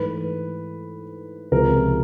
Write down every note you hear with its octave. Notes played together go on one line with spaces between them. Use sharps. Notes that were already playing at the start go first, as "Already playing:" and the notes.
Already playing: G#2 E3 A3 B4
C#2 C3 F3 G#3 A#4